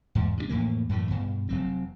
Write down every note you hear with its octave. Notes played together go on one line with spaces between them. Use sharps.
E2 G#2
C3 F#3 D4
F2 A2 E3 A#3
F#2 A2 E3 A3
G2 B2
F1 F#3 C4